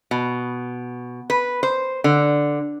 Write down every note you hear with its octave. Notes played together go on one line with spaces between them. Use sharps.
B2
B4
C5
D3